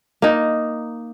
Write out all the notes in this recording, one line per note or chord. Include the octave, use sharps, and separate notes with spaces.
A#3 D#4